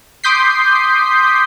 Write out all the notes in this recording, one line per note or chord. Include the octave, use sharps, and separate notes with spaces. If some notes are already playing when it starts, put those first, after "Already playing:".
C6 D6 D#6 G6 B6 C7